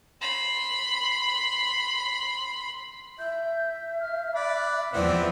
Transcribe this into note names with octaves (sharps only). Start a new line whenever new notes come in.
B5 C6
E5 G6
F6
D5 B5 F#6
E2 E3 F3 B3 C4 E4 D5